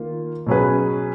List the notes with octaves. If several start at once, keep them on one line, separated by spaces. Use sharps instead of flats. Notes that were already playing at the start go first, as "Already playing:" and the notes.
Already playing: D#3 A#3 F4
B2 F#3 C#4 G#4 B4